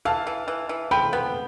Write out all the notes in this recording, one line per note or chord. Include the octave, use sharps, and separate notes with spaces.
E3 F5 A5
E3
E3
E3
F3 G5 B5
B3